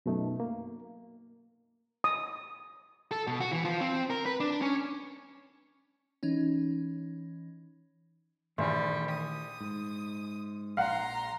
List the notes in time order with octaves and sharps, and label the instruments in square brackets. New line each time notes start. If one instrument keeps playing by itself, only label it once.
[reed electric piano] F#2 B2 A3 D#4
A#3
[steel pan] D#6
[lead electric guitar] A4
B2
F#4
E3
F3
C4
A#4
B4
D4
C#4
[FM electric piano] E3 C#4 D#4
[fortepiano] A#1 [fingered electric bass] D#3 E3 A3 [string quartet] G3
[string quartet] D#6
[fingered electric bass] G#2
[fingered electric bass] A#1 [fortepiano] F5 F#5 [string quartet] A#5 C6